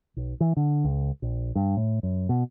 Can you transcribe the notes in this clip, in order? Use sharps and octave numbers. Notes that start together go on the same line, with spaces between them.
B1
E3
D3
C#2
A#1
G2
A2
F#2
B2